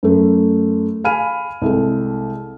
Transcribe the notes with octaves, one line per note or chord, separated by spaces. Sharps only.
F#2 A3
F5 G#5 B5 F6 D#7
C2 G#3 A4